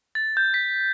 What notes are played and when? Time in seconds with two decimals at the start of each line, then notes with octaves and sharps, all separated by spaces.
0.15 A6
0.37 G6
0.54 B6